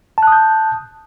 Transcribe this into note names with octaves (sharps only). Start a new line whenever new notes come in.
A5 D#6 F#6 G6